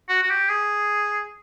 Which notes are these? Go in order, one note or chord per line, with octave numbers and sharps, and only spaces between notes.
F#4
F#4
G4
G#4